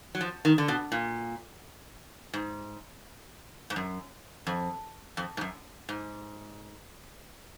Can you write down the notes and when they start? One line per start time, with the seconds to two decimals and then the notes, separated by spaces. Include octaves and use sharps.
0.15 F#3
0.21 F3
0.45 D#3
0.58 D3
0.68 B2
0.92 A#2
2.33 G#2
3.70 G#2
3.76 F#2
4.47 F2
5.17 F2
5.37 G#2
5.41 F#2
5.89 G#2